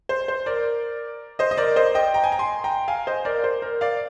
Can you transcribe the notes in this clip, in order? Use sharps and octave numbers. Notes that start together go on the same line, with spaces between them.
C5
C5
A#4 D5
C5 D#5
D#5
A#4 D5
C5 D#5
D#5 G5
G5 A#5
G#5
A#5
G#5 C6
G5 A#5
F5 G#5
C5 D#5
A#4 D5
C5
A#4
D5 F5